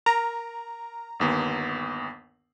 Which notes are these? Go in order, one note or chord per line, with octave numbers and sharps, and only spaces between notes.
A#4 A#5
G1 D#2 B3